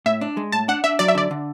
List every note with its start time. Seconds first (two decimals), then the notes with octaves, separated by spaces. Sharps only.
0.06 A2 E5
0.21 D4
0.37 G#3
0.52 A2 A5
0.68 D4 F#5
0.84 D4 E5
0.99 F#3 D5
1.08 E5
1.15 D3 D5
1.31 D3